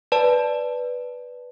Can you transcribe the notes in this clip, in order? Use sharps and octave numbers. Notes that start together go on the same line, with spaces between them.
B4 D5 A5